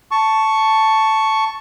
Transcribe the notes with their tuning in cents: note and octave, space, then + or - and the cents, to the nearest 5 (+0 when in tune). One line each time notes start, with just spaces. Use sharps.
A5 +0 C#6 +5